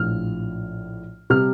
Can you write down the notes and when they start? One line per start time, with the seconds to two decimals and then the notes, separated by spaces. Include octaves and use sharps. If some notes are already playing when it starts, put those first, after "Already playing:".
Already playing: A#1 A2 F3 F6
1.30 C3 G3 F6